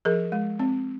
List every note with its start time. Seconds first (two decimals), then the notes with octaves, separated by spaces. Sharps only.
0.05 F3 G#4 A#4
0.32 G#3
0.59 C4